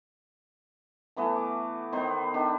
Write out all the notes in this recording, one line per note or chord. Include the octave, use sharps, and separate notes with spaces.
E3 A3 B3 A5
D6
D#3 B3 C5
D#3 B3 D4